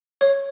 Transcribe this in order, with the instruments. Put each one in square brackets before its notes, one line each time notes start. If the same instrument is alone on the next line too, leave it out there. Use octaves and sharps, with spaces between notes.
[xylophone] C#5